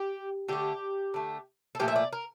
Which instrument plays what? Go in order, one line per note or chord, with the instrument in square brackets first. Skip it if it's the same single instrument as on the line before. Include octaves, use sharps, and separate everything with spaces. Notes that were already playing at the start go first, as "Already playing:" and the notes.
Already playing: [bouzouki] G4
D3 A3 G4
D3 A3
A4
A#2 F3 A3 G4
E5
D5
A#4